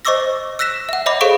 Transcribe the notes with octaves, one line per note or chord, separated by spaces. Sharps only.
C5 D#5 C#6 D6 E6 A#6
E6 F#6 A#6 B6 E7
E5 F#5
C#5 D#5 E5 B5 D6
G#4 A4 C5 F5 C#6 D7